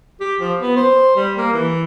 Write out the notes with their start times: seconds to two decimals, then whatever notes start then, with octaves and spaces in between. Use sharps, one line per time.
0.21 G4
0.40 F3
0.60 B3
0.76 C5
1.16 G3
1.37 A#3
1.53 E3